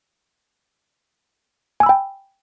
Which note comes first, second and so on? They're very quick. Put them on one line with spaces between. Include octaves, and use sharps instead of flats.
G#5 E6 B5 G5